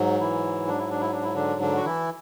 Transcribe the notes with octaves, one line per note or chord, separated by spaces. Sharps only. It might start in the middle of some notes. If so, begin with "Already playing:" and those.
Already playing: G#2 F#3
E3 E4
D4
E4
D4
E4
D4
E4
D3 D4
D3 D4
F#4
E3 E4